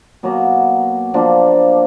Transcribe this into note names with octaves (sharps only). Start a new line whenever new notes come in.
B2 F#3 A#3
F3 A#3 D4